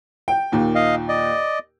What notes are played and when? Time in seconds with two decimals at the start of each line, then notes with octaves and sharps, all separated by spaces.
0.28 G5
0.52 D#2 A#2
0.75 D#5 F5
1.08 D5 D#5